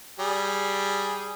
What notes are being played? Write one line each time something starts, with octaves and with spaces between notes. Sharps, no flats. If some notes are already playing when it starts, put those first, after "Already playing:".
G3 G#4